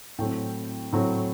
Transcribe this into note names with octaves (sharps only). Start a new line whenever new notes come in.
A2 F#3 A3 C4 G5
A2 F#3 A3 C4